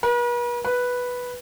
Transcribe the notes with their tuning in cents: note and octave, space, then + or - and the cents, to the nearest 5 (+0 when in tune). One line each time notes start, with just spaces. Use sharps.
B4 -45
B4 -5